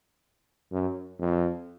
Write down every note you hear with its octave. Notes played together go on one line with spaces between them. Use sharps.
F#2
F2